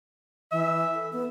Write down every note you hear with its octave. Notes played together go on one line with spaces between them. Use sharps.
E3 E5
A4
B3